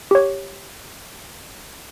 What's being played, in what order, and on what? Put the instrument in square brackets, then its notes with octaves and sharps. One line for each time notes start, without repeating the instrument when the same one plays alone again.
[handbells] G4 C#5